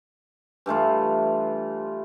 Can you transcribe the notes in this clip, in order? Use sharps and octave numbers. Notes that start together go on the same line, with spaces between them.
G2 E3 A3 F4